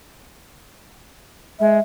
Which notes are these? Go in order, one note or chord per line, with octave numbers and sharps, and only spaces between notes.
G#3 E5